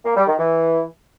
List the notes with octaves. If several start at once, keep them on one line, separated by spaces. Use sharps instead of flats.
A#3
G3
D#3
E3